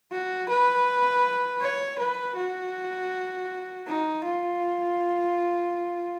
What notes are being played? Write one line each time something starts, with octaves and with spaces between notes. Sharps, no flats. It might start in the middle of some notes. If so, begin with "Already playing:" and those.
F#4
B4
C#5
B4
F#4
D#4
F4